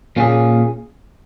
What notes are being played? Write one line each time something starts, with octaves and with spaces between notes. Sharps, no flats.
A#2 A#3 C#4 G#4